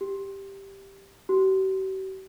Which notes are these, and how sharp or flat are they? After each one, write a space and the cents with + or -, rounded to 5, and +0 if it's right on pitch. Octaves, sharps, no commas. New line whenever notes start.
G4 +0
G4 -45